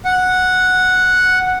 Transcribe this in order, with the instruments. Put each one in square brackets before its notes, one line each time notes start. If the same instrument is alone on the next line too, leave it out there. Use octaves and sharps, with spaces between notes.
[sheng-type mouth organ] F#5